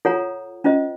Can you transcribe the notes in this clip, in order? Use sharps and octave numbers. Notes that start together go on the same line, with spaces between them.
F4 A4 C#5 F#5 A#5
C#4 F4 C5 D#5